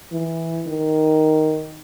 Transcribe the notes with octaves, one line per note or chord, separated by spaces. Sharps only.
E3
D#3